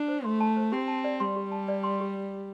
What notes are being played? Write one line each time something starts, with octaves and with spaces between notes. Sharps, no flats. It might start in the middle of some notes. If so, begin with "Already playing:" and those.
Already playing: D4
C5
A3 C6
A5
C5
C4 G4
A5
D5
G3 C6
G4
A5
D5
C6
G4